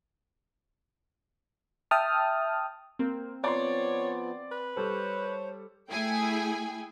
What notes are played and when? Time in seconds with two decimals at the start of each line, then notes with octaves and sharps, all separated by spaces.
1.91 E5 G5 A5 D#6 F6
2.99 A#3 C4
3.44 F3 B3 C#5 D5 C6
4.51 B4
4.76 G3 A4 C5 C#5
5.90 A3 E4 G#4 G5 G#5